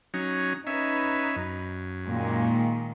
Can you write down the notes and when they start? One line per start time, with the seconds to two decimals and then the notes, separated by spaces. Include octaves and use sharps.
0.14 F#3 C#4 D#4
0.67 C#4 D#4 B4 E5
1.36 F#2
2.08 A#2 D#3 G#3